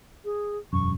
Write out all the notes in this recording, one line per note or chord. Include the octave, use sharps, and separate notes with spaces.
G#4
E1 F#2 C#6